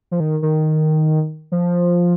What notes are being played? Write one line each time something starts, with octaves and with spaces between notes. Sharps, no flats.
F3
D#3
D#3
F3